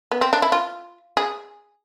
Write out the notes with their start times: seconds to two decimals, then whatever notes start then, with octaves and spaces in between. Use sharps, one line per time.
0.11 B3
0.21 C4
0.33 D4
0.42 E4
0.52 F4
1.17 G#4